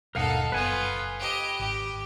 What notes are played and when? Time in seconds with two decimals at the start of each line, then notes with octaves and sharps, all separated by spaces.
0.15 D#1 G2 B2 D#4 A4 A#4 F5 F#5
0.52 F#1 B3 F4 B4 G#5
1.19 G4 D#5
1.59 G#1 G4